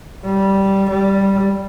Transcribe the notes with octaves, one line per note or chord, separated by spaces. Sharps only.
G3
G3